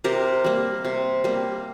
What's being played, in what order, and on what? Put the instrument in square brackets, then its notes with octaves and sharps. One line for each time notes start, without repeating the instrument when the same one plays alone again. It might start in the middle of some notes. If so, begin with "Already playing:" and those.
[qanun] C3 G4 A#4
G3 A#3
C3
G3 A#3